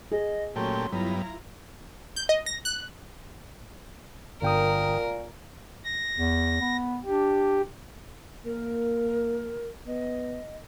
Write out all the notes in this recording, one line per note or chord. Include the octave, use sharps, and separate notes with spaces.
G#4 D#5
A#2 F#3 A3 C#4 G4 C6
G2 F#3 B3 E4 F4 A#5
G6
D#5
A#6
F#6
G1 A#2 A#4 G5 D#6
A#6
E2
B3
D4 G4
A#3 A#4
B3 D#5